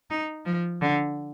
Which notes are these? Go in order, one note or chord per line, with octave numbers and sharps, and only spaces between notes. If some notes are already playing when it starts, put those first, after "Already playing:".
D#4
F3
D3